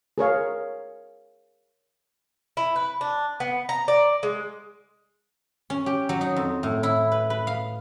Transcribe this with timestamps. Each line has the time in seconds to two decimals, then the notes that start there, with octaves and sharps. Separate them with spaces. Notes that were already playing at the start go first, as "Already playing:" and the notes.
0.18 G#4 A#4 C#5 F5
2.57 E4
2.76 B4
3.01 D4
3.40 B3
3.69 A#5
3.88 D5
4.23 G#3
5.70 C#4
5.86 G4
6.09 F#3
6.21 D#4
6.36 F2
6.63 A2
6.83 E4
7.12 B4
7.30 B4
7.47 F5